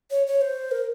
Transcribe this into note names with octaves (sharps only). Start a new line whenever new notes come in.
C#5
C#5
C5
A#4